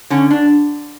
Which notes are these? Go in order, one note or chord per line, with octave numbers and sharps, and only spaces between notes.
D3 C#4
D4